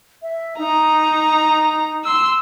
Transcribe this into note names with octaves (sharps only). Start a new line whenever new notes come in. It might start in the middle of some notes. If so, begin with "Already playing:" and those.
E5
D#4 A#5
C6 E6